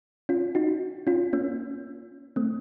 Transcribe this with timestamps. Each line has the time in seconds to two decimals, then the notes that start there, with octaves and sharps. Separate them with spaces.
0.29 C#4 F4
0.55 D#4 F#4
1.07 C#4 F4
1.33 A#3 C#4
2.36 A3 C4